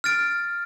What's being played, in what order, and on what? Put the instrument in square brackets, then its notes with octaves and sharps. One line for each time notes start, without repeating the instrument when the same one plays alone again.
[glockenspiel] F6 A6 D7